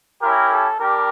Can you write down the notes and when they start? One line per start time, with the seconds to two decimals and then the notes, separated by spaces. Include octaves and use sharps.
0.21 C#4 E4 G4 A#4
0.50 A4
0.79 G3 D4 G4 A#4